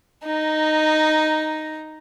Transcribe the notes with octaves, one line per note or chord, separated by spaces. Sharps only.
D#4 A#5